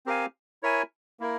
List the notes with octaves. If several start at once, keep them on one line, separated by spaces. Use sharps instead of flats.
C4 G4 A#4 F5 G#5
E4 A#4 C#5 E5 G#5
A#3 E4 A#4